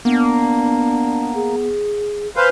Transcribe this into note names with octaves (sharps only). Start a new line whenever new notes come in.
A#3 B3 D4
G#4
B4 C5 F5 G#5